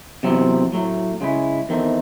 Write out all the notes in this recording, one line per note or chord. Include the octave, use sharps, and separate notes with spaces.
E2 C3 F#3 C4
A2 F#3 A3
C#3 G#3 C#4 E4
E2 D#3 A3 C4